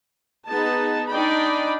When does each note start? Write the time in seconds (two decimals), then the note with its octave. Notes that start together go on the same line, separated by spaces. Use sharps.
0.49 B3 D#4 G#4 A5
1.10 D4 D#4 D5 G5 B5